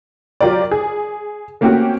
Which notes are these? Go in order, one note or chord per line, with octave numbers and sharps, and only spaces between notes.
F#3 F4 G4 A#4 D5
G#4
A3 A#3 C4 C#4 F#4 G4